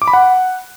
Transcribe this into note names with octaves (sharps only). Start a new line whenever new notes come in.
D6
B5
F#5